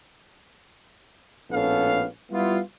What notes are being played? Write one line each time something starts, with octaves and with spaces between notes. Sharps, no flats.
A#1 A2 B3 C#4 A4 F5
G3 B3 E4 F4